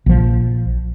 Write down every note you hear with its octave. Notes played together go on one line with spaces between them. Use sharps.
A#1 F3